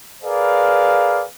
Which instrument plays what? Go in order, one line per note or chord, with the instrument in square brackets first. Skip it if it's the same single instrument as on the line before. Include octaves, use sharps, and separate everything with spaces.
[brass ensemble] G#4 A#4 B4 D5 F5